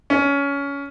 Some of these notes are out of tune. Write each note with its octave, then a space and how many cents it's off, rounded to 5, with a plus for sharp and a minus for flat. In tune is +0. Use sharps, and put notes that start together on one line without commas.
C#4 +20